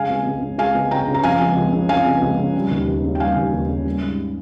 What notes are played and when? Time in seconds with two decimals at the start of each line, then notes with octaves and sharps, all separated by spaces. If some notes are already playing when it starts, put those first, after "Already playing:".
Already playing: C#3 G#3 F5 G#5
0.10 C#2
0.26 C#2
0.42 C#3
0.58 G#3 F5 G#5
0.75 C#2
0.91 C#2 G5 A#5
1.08 C#3
1.14 A#5
1.23 F3 F5 G#5
1.40 C#2
1.56 C#2
1.73 C#3
1.89 F3 F5 G#5
2.06 C#2
2.22 C#2
2.39 C#3
2.55 G3
2.71 D#2
2.88 D#2
3.04 C#3
3.15 G5
3.20 G3 F5 G#5
3.36 D#2
3.53 D#2
3.69 C#3
3.86 G3
4.02 G#2